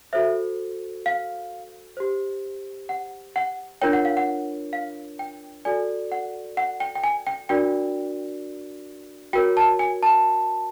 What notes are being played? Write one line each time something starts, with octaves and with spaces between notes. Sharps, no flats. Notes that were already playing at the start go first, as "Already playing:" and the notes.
F#4 A4 C5 E5
F5
G4 C5
F#5
F#5
D4 F4 A#4 C#5 G5
F#5
F5
F#5
F5
G5
F#4 A4 D5 G#5
F#5
F#5
G5
G5
G#5
G5
D4 F#4 A#4 D5 G5
F#4 A#4 C#5 G5
A5
G#5
A5